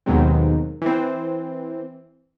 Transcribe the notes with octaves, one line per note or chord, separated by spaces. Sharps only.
D#2 B2 D#3 F#3 G#3 C4
E3 C4